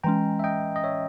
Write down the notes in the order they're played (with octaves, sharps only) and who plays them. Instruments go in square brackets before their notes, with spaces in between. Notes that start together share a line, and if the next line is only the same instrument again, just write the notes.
[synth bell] E3 G#3 C#4 [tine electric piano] G5 A#5
[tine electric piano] E5
D#5 G5
D#5
C#5 E5